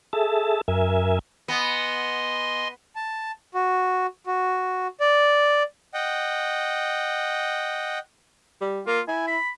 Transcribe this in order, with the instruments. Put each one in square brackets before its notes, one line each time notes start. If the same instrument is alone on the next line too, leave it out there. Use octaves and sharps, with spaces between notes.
[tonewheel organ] G#4 A4 E5 A5
F#2 A#4 E5 G#5
[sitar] B3 [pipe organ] D#5 G#5 C6
[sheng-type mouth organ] A5
F#4
F#4
D5
D#5 F#5 G5
[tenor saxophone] G3
[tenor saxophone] A#3 [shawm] F4
[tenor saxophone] E4 [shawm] G#5
[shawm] B5